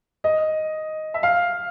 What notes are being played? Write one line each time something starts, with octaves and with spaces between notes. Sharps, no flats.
D#5
E5
F5